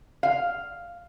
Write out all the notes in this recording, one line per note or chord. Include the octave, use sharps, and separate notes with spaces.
F5